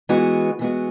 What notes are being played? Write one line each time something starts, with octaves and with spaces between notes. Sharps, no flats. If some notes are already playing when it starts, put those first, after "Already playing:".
E3 G#3 B3 F#4
E3 G#3 B3 F#4